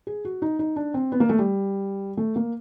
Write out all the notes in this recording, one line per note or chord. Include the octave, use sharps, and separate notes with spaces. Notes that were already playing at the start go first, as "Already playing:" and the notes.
G#4
F#4
D#4
D#4
D4
C4
B3
A#3
A3
G3
A3
A#3